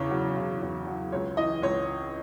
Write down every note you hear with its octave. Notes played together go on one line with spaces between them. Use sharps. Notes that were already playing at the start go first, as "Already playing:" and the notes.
Already playing: E2 C#3 C#5
F#3
C#3
E2
F#3
C#2 C#5
E3 D#5
C#2 C#5